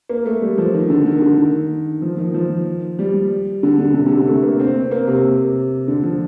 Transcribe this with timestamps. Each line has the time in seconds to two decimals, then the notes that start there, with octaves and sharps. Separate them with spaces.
0.09 A#3
0.26 A3
0.42 G3
0.58 F3
0.74 D#3
0.90 D3
1.06 D#3
1.22 D3
1.38 D#3
2.02 F3
2.18 D#3
2.34 F3
2.99 G3
3.63 D3
3.79 D3
3.95 C3
4.06 D3
4.12 C3
4.27 A3
4.43 A#3
4.60 C4
4.81 C4
4.91 A#3
5.07 C3
5.88 D3
6.04 F3